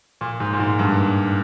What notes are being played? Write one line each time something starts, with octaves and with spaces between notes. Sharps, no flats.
A#2
G#2
A#2
G#2
G2